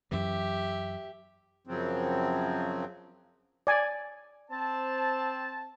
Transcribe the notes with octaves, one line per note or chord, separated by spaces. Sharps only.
F#2 E3 G4 E5
F#2 C#3 F3 F#3 C4
D5 G#5
C4 A5